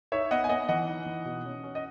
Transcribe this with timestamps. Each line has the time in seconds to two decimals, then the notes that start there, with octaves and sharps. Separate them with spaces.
0.12 D#4 C#5 E5
0.31 B3 D#5 F#5
0.44 G#5
0.49 B3 D#5 F#5
0.68 E3 D#5 F#5
0.88 D#4
1.06 E3
1.25 B2
1.45 C#4
1.63 C#4
1.75 D#5